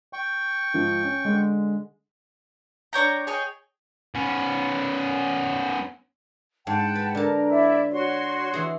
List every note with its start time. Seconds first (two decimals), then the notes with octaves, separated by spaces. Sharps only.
0.13 G5 C#6
0.73 G#2 F3
1.03 C#4
1.25 D3 G#3
2.93 D4 C#5 G5 A#5
3.27 G#4 C#5 D#5 G5
4.15 B3 C#4
6.67 G#2 F#5 G5 A5
6.95 B4
7.15 D3 A#4 A5
7.49 E4 D5 E5
7.91 F#4 C#5 C6
8.54 E3 G#4